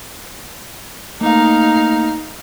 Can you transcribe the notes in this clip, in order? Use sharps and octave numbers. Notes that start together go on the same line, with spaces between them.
A3 A#3 D#4 F5